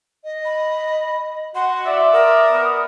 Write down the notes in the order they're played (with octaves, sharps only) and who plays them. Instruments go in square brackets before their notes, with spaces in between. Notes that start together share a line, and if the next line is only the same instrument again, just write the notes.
[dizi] D#5
[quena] B5
[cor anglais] F#4 [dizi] F#5 [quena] C6
[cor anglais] D5 [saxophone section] E5
[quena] A#4 [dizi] D#6
[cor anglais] B3